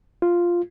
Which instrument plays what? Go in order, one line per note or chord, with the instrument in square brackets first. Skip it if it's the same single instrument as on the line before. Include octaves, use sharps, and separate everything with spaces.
[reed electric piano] F4